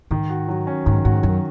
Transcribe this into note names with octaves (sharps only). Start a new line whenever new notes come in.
G#2 D#3
F#4
F#3
C#4
G#2 D#3
G#2 F#4
F#2 F#3